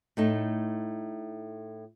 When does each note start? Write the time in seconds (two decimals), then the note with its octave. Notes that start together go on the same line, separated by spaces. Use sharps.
0.17 A2 A3 D#4